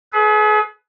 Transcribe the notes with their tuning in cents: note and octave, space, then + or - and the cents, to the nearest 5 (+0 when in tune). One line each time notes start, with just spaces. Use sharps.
G#4 +40 B4 +0